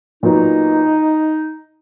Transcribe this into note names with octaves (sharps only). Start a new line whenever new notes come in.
A#2 F#3 B3 D#4